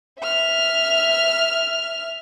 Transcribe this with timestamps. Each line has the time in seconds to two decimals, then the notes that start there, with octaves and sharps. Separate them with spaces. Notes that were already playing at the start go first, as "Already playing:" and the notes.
0.19 E5 F6